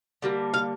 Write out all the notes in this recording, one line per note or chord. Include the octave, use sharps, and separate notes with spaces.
D3 G3 A#3
F5